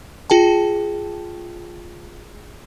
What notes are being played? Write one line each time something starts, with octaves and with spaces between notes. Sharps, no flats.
F4 G#4 G5 A5